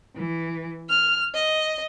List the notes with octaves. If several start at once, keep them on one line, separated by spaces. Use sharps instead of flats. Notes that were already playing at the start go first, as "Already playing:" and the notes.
E3
F6
D#5